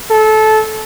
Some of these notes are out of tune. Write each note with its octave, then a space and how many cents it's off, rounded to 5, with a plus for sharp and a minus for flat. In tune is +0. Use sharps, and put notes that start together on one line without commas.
A4 -20